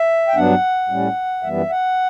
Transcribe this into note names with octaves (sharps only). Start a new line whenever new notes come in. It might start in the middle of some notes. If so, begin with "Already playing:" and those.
Already playing: E5
G5
G2 F#3 B3 D4 F#5
A2 G3 C#4
F#2 E3 G3 B3 E5
F#5